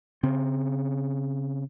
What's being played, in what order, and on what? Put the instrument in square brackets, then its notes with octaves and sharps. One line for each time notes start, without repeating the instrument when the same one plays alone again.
[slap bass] C#3 C4